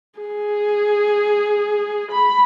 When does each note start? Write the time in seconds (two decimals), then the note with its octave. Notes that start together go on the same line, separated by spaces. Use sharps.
0.20 G#4
2.11 B5